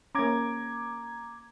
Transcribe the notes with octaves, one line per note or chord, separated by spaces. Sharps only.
A#3 C#4 A#5 D6 G#6